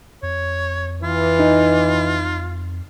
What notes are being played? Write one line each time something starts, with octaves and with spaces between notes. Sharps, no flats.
F2 C#5
E3 F4
D#4